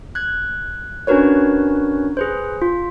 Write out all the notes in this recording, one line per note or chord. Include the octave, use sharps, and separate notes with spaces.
F#6 G#6
C#4 D4 F#4 A#4 B4 C#5
G#4 B4 C5
F4